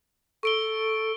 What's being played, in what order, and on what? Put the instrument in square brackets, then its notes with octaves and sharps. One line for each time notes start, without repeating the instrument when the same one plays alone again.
[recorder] A4 [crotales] C#6 D7 G7